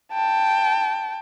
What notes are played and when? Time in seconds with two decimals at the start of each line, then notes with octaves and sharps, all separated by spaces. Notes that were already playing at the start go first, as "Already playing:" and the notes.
0.13 G5 A5